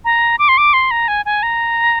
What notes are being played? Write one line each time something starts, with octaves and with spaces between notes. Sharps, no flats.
A#5
D6
C6
D6
C6
A#5
G#5
G#5
A#5